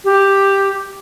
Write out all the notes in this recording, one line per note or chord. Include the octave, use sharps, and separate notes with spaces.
G4